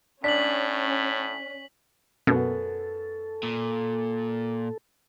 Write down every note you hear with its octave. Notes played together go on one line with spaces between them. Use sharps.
A2 C#4 D4 B6 F#7
F#2 B2 B3 A4
A#2